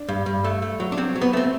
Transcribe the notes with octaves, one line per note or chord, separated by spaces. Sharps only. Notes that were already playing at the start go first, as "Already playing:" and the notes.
Already playing: D4
G2
G2
A3
A3
F#3
D4
F#3 C4
F#3
B3
A3 C4